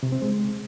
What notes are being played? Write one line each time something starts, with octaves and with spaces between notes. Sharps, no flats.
C3
C4
G#3